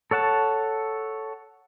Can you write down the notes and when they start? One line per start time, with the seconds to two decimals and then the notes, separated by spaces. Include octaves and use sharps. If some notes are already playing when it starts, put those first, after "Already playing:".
0.11 A4 C#5 F#5 A5